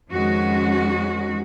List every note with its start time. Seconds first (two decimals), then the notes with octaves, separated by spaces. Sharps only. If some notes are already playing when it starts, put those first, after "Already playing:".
0.10 F2 D#3 G#3 C#4 F#4